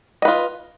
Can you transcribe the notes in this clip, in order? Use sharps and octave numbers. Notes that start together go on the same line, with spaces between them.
F4 B4 D#5